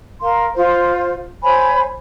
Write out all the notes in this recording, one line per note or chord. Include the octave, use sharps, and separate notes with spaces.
A#4 F5 C6
F4 C5
C5 C#5 G#5 B5